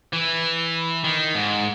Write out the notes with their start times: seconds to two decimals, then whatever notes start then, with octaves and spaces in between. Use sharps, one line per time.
0.13 E3
1.04 D#3
1.35 G#2